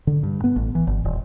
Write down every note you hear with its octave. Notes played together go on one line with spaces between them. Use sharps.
D3
G2
B3
A1
E3
G1
D#1